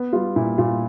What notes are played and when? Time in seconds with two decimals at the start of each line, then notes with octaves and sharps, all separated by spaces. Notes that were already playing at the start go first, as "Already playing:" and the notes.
Already playing: B3
0.13 G3 F4
0.36 A#2 E4
0.58 A#2 F4